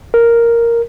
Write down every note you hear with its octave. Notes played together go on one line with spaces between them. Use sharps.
A#4